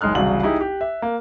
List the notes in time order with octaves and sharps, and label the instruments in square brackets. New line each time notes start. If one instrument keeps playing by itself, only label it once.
[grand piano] F#1 G#3 D#4 F6 F#6
E1 C2 C#3 F#3 F#7
D#4 E4 G4 G#4
G4
E5
A#3